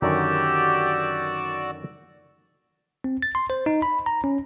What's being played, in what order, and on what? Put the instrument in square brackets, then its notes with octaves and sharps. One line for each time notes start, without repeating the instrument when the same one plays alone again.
[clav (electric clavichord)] F#2 D3 D#3 [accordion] F#4 D5 E6 [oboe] G4
[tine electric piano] C4
A6
C6
C5
D#4
B5
A#5
C#4